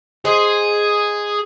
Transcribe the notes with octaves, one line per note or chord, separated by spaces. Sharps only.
G#4 C5 D#5